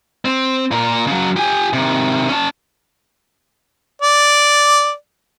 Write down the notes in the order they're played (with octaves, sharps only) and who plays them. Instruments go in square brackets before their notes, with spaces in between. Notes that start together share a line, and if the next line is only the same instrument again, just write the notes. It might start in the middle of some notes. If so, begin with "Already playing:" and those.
[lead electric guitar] C4
A#2 A#4
C#3 F#3
G4 G#5
C3 D#3
C#4 A5
[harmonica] D5